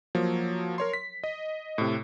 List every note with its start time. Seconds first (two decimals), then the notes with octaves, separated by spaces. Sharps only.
0.15 F3 F#3 A#3
0.78 A#4 C#5 C6
0.93 B6
1.24 D#5
1.78 A2 C3